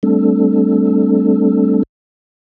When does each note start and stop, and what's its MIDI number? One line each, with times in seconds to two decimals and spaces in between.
0.03 1.83 55
0.03 1.83 57
0.03 1.83 60
0.03 1.83 62
0.03 1.83 69